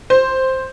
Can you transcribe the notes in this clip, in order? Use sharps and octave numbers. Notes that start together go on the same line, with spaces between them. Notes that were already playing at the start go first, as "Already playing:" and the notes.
C5